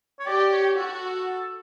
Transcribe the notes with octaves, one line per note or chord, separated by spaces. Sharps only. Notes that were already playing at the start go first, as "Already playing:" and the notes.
C#5
G4 D5
C#5
F#4 A4